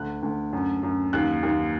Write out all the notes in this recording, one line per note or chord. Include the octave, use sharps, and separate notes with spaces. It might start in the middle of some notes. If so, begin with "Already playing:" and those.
Already playing: D2 F#6
D2
F#2
F#2
D#2 F#6
D#2